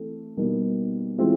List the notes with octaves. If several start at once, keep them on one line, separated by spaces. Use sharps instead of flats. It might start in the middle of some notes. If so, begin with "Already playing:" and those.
Already playing: E3 A3 C4
B2 G3 A#3 D#4
E3 G#3 C4 F4